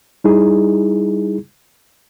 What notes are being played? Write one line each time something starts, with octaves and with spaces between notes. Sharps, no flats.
G3 D#4 E4 G#4